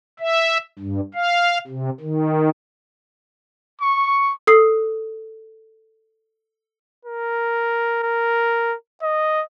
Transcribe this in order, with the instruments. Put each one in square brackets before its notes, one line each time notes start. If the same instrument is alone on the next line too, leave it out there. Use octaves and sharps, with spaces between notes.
[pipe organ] E5
G2
F5
C3
D#3
[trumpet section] C#6
[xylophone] A4 D#6 C7
[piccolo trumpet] A#4
A#4
D#5